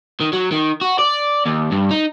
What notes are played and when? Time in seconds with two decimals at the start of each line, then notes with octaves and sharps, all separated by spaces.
0.20 D#3
0.33 F#3
0.52 D#3
0.81 F#4
0.99 D5
1.46 D#2
1.72 G2
1.91 D#4